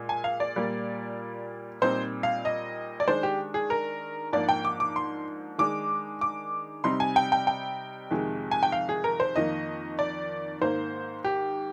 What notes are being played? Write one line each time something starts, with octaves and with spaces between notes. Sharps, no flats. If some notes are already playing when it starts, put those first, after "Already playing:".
Already playing: A#2 G#3
G#5
F5
D5
A#2 G3 A#3
A#2 G3 C4 D#4 C5
F5
D#5
D5
D#3 G#3 D4 C5
G4
G#4
A#4
G#2 F3 A#3 D4 D5
G5
D6
D6
C6
D#3 G#3 D4 D6
D6
C3 G3 C4 D#4 C6
G#5
G5
G5
G5
F2 C3 D#3 G#3
G#5
G5
F5
G#4
A#4
C5
F2 D#3 A#3 D#5
D5
G#2 D#3 A#3 C5
G4